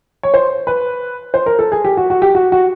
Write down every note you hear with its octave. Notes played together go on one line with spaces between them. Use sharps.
C#5
C5
B4
C5
A#4
A4
G#4
G4
F#4
F#4
G4
F#4
F#4